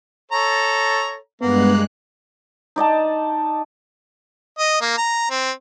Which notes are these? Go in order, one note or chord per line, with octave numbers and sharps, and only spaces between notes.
A4 C#5 A#5
G2 G#3 A#3 B3 F#6
D#4 D5 D#5 A5
D#5
A#3
A#5
C4